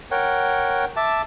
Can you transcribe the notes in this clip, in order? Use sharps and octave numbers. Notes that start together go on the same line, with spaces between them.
A#4 C#5 F#5 G5
E5 A5 D6